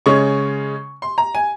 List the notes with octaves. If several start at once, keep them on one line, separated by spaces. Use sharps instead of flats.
C#3 G#3 C#4 C#6
C6
A#5
G#5